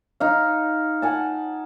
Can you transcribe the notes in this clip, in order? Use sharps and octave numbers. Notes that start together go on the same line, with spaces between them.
D#4 F5
F#5 G#5 A5